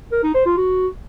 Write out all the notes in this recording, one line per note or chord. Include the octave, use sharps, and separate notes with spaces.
A#4
D#4
C5
F4
F#4